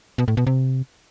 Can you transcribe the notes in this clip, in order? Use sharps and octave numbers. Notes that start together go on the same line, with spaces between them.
B2
A2
B2
C3